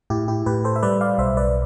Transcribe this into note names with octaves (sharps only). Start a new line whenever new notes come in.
A2 E4 G4
E4 G4
A2 G4 B4
A4 C5
E5
G3 B4 D5
D5 F5
B1 C5 E5
B4 D5